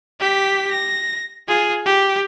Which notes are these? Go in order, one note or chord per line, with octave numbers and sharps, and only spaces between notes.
G4 B6
A#6
F4 G#4
G4